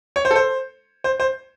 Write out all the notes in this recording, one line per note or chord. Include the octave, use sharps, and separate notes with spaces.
C#5
C5
A4
C5
C5
C5